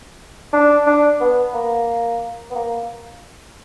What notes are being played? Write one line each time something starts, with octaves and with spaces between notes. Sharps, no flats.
D4
D4
B3
A#3
B3
A#3